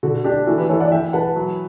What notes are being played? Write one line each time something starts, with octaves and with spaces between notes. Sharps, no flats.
D3 F#4
D4 G4
E3 F#4 A4
G4 B4
E3 A4 C#5
D5 F#5
E3 E5 G5
B4 F#5 A5
F#3